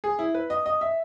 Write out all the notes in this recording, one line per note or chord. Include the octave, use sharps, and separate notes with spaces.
G#4
E4
B4
D#5
D#5
E5